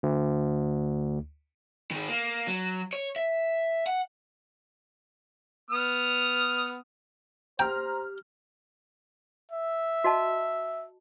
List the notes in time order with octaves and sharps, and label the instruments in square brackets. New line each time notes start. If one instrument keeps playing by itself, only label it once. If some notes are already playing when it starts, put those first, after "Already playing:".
[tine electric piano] D2
[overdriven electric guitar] D#3 G#4
A#3
F#3
C#5
E5
F#5
[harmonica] B3 D#6 F6
[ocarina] G4 [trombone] C5 [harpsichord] G5 [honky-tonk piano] A#5 F6
[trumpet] E5
[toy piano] F#4 D#5 A5